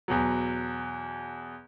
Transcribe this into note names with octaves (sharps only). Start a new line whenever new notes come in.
E2 B2 F#3